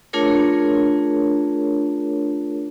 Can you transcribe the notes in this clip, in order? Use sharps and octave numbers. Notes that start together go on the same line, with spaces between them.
A3 D4 F4 G#4 A#4 C#5